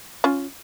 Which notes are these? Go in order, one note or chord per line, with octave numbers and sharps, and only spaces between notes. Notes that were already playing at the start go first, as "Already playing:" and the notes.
C#4 F4